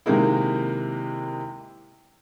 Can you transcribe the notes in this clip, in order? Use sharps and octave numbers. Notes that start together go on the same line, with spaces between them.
C3 D#3 G#3 A#3 D#4 E4